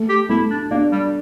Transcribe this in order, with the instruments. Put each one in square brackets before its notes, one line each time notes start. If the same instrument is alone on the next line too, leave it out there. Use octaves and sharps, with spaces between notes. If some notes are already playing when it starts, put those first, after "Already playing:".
Already playing: [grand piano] A3
[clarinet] G4
[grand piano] A3 [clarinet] E4
[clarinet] D4
[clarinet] A#3 [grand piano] D4
[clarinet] G3